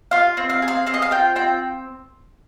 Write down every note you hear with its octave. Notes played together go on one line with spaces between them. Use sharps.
F4 F5
C4
F5
G#4
F5
C4 F5
D#5
F5
F4 G5
C4 G5